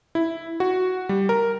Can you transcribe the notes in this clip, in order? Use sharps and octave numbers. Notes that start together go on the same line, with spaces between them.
E4
F#4
G3
A#4